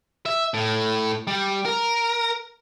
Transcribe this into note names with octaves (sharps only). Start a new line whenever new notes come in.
E5
A2
G3
A#4